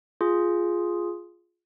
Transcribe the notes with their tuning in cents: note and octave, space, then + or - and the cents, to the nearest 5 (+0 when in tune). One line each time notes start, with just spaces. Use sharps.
F4 +0 G#4 +0